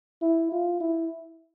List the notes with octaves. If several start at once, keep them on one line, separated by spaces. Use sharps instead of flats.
E4
F4
E4